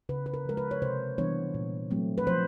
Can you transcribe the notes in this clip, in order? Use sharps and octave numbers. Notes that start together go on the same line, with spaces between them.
C#3 B4
B4
A#4
F3 G#3 A#4
B4
C#5
C3 C5
E3 G3 B3 D4 C#5
A#2
F#3 A3 C4
B4
F3 C5